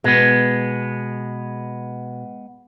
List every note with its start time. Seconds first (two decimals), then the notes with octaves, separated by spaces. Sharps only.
0.04 B2 G#3 B3